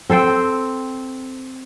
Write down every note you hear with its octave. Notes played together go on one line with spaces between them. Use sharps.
C4 A4 C5 G5